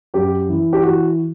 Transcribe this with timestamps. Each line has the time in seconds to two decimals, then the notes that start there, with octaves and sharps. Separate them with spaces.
0.14 F#2 G4
0.49 E3
0.73 G4
0.82 E3 F#4